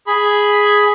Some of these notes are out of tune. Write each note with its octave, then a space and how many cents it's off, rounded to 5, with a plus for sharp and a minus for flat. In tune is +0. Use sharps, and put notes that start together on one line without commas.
G#4 +0 B5 +0